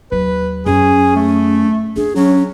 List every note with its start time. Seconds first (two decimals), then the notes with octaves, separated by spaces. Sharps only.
0.12 D#2 F#3 B4
0.66 F#2 C#4 G#4
1.16 A3
1.96 D4 G#4
2.16 F#3 C#4